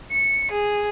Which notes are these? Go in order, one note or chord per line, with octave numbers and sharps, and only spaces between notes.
C#7
G#4